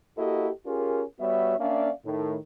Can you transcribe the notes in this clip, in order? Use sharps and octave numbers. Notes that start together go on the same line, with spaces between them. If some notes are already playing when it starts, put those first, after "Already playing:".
A#3 E4 F#4 G4 A4 D#5
C#4 F4 G4 G#4 A#4
G3 B3 F#4 C#5 E5
A#3 C#4 D4 D5 E5 F5
A2 D#3